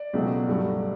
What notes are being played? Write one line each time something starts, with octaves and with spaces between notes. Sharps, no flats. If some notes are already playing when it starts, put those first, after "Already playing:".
Already playing: D5
C#2 B2 F#3 A3
G2 F#3 A3